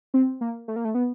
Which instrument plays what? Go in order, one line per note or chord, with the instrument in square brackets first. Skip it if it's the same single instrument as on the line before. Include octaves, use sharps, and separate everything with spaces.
[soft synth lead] C4
A#3
A3
A#3
A3
B3